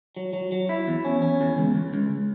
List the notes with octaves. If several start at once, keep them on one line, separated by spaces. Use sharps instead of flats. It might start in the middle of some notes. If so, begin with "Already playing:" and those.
F#3
F#3
F#3
E4
E2
C#4
C#4
E2
C#2
C#2
C#2